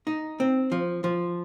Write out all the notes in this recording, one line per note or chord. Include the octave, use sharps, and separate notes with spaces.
D#4
C4
F3
F3